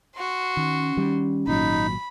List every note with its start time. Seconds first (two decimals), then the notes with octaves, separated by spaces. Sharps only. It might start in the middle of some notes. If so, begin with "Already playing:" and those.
0.16 F#4 C6
0.57 D#3 C#4
0.97 D#3 G3
1.47 G#1 A#2 F#3 D#4 B5